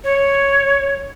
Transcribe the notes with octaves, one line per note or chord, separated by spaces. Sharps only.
C#5